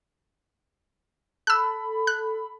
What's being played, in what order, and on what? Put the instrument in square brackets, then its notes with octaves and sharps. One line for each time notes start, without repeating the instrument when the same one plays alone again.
[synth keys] A4 B5 [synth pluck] E6 F#6
[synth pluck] F#6